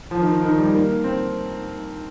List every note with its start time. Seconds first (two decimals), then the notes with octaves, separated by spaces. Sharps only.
0.11 F3
0.22 D#3
0.42 D#3
0.58 G3
0.73 A#3
1.04 C4